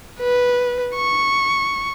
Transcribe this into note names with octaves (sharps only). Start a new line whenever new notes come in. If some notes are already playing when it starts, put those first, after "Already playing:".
B4
C#6